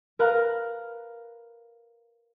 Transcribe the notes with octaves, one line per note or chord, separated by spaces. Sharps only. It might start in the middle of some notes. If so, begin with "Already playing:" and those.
A#4 B4 F5 A#5 F#6